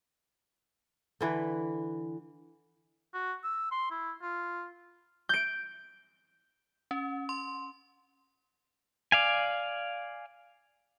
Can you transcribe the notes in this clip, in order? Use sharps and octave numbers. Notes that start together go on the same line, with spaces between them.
D3 E3 B4
F#4
E6
C6
E4
F4
G6 D7
C#4
C6
D5 F5 G#5